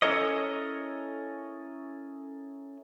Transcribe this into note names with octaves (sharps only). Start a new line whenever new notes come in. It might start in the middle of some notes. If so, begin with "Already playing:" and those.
C#4 E4 A4 A#4 C#5 D#5